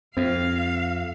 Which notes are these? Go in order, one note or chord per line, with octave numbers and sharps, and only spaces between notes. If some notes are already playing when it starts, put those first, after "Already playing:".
F2 C4 F5